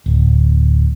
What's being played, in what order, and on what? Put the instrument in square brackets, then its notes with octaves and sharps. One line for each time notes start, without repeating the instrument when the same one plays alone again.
[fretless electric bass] D1